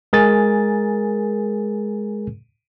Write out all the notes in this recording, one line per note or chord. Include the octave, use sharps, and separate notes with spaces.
G#3 G#4 A#4 G#5 A6